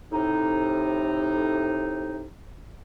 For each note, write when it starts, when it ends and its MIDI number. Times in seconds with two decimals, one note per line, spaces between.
0.12 2.25 45
0.12 2.25 48
0.12 2.25 63